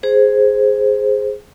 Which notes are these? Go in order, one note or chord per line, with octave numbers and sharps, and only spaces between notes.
G#4 C5